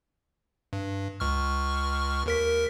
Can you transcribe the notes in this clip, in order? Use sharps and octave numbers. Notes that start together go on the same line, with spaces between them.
G2
C#2 C#6 F6
D#2 A#4 B6